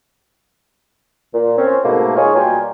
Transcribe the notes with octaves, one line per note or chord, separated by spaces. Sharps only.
A#2
C4 C#4
G#2 B2 A3 A#3
G#3 D#4 F4 G#4 C#5
B2 G3 A#3 F4 G5 G#5